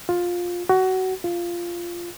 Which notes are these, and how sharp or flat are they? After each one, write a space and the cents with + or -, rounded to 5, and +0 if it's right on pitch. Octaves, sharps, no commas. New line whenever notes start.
F4 +15
F#4 +20
F4 -10